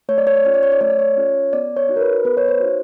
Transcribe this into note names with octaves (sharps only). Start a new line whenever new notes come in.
A3 C#5
D5
C#5
D5
C#4 F4 A4 C#5
D5
C#5
D5
A3 C#5
D5
C#5
C#4 F4 A4
B3 D5
C#5
D#4 F#4
A#4
B4
B3 B4
C#5
C5
D#4 F#4